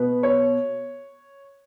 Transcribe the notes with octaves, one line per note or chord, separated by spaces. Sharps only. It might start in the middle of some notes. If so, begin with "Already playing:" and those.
Already playing: B2 B4
C#5